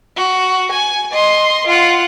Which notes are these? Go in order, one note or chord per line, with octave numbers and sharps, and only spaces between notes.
F#4
G#5
D#5 C6
F4 F#5